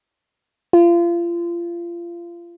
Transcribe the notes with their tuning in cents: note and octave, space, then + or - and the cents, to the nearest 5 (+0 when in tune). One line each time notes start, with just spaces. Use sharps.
F4 -30